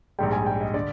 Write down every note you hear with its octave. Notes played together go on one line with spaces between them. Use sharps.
A#1 G#2 G3 G5
G#5
G5
D#5
D3 D5